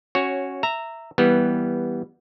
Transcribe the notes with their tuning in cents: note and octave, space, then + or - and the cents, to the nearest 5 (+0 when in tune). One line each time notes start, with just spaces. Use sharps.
C#4 -15 F#4 +0 C#5 +0
E5 +0 A#5 -15
E3 -10 G3 +0 B3 -15